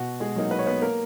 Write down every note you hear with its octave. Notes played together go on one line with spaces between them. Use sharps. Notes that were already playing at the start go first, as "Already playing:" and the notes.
Already playing: B2 F#4
G#3 G#4
F#3 A#3 D#4
B4
C#5
B3 B4
A#3 A#4